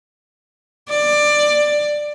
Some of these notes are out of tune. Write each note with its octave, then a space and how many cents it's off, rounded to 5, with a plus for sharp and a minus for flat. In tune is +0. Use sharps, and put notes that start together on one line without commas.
D5 +15